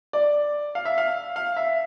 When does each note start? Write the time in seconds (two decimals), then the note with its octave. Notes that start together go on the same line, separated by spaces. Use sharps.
0.13 D5
0.75 F5
0.85 E5
0.98 F5
1.36 F5
1.57 E5